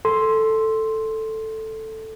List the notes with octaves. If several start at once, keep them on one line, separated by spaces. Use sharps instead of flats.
A4 C6